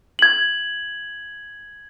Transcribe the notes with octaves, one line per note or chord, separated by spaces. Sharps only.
G#6 F#7